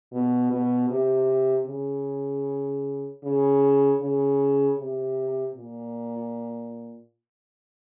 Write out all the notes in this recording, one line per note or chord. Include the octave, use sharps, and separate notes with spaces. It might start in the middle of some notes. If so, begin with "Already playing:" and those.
B2
B2
C3
C#3
C#3
C#3
C3
A#2